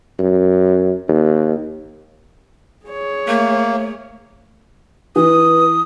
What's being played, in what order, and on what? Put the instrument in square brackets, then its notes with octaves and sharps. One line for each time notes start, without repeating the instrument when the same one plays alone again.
[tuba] F#2
D#2
[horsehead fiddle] G#4 C#5
[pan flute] A3 [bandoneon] A#3
[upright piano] E3 [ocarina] B4 [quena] D#6